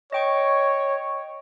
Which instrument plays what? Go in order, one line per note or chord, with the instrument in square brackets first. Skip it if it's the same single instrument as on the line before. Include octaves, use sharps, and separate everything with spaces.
[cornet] C#5 [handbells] D#5 G5 C#6